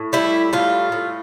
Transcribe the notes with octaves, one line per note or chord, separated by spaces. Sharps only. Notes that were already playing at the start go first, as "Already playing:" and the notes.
Already playing: A2
G3 E4
A2 F4
A2